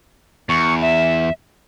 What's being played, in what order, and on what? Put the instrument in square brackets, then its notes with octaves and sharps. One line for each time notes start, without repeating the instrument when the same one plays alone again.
[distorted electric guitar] E2 [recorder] C#6
[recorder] E5